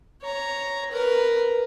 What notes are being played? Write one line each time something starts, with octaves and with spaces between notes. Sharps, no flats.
C#5 A#5
A#4 B4